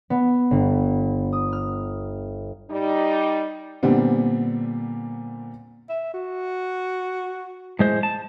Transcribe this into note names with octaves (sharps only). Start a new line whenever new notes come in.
B3
G1
D#6
F6
G3 D#4
A#2 D3 G3 B3 C4
E5
F#4
A2 G#3 C5
A5